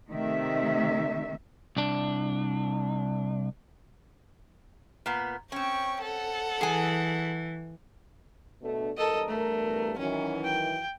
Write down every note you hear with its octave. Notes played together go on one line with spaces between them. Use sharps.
C3 D#3 A3 E5
C2 D4
A#2 B3
C4 C#4 G5 C#6
A4 F#5
E3 G#4 G#5
B2 A3 D4
E2 G2 A4 A#4 D#5
A3
D#3 E3 F#3 C#4
G5